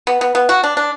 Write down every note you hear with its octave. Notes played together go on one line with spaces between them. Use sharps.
B3
B3
B3
F#4
D4
D4